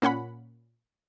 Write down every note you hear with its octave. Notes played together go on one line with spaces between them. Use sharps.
A#2 C#4 F#5 B5